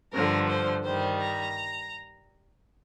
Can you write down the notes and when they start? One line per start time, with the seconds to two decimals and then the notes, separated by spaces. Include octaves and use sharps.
0.13 G2 D3 F3 A#4
0.49 C5
0.84 G2 D#3 G3 C5
1.20 A#5